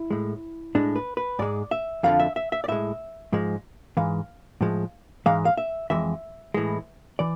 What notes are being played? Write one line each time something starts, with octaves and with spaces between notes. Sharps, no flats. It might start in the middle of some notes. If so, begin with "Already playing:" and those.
Already playing: E4
A2 G#3
A2 G#3 D4
B4
B4
G#2 G#3 D5
E5
F2 D3 F3 F5
E5
E5
E5
D5
A2 G#3 E5
G#2 F3 G#3
G#2 E3 G#3 F5
A2 F3 G#3
G#2 E3 G#3 F5
F5
E5
F2 E3 G#3 E5
A2 E3 G#3
E3 D5